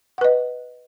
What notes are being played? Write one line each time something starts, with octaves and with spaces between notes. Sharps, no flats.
B4 D#5 F#5